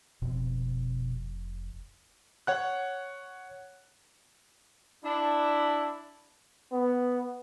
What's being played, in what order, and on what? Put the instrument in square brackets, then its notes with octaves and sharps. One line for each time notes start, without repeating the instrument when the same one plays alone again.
[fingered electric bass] F1 [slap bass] B2 C4
[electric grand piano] C#5 F#5 F#6
[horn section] D4 E4
[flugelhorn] B3